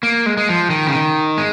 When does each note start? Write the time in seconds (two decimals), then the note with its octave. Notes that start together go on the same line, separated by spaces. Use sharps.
0.03 A#3
0.26 G#3
0.37 G#3
0.49 F3
0.70 D#3
0.87 C#3
0.94 D#3
1.38 G#3